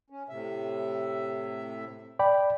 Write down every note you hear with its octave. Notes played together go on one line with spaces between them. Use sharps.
C#4
A2 C3 E5
D5 G5 B5